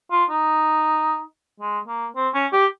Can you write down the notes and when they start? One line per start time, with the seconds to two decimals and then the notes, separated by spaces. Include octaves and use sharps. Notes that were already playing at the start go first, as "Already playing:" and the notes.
0.11 F4
0.30 D#4
1.60 G#3
1.88 A#3
2.16 C4
2.34 C#4
2.53 G4